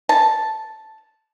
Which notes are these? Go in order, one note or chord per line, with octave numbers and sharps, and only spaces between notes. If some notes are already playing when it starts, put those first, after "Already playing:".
A5